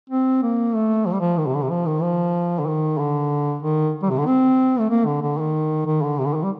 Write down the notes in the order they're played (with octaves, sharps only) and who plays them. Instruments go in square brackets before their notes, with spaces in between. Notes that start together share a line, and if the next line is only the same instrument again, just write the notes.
[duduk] C4
A#3
A3
F3
G3
F3
D#3
C3
D3
C3
F3
D#3
F3
D3
D#3
D3
D#3
G3
C3
D3
C4
A3
A#3
D3
D3
D#3
D#3
D3
C3
D3
D#3
G3